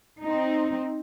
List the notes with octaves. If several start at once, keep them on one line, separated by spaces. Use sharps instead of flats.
C4 D#4